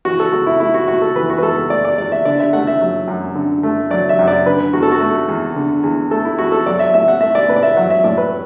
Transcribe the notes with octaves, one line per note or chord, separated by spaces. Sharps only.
E3 F#4
A4
E2 F#4
E4
A3 E4
F#4
E2 F#4
A4
E3 B4
F#4
B4
E2 A4
A3 D5
D5
E2 D5
E5
D3 D5
E5
A3 F#5
E5
F#3
F#2
D3
A3
F#3 D5
E5
F#2
D5
D3 B4
E2 F#4
A4
F#4
A3
E2
D3
E2
A3 A4
E4
E2 F#4
A4
F#3 D5
E5
A2 E5
F#5
A3 E5
D5
A2 B4
D5
E5
F#3 F#5
E5
A2 D5
B4